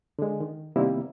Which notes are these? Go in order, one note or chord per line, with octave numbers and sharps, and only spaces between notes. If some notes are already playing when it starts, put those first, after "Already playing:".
D3 G#3
D#3
C3 D#3 G3 A#3 B3 E4